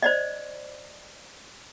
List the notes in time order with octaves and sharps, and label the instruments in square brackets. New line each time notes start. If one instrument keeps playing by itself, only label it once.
[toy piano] C5 D5 D#5